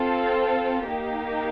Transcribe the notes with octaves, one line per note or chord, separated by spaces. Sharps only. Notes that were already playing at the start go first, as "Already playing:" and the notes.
Already playing: C4 F4 A4
A#3 D#4 G4